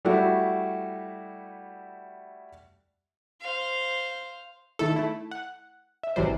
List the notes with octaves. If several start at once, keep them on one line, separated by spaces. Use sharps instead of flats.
G3 A3 E4 F#4
C5 F5
D#3 A3 E4 A4
A3 E4
F#5
E5
A1 C3 E3 F#3 G3 C5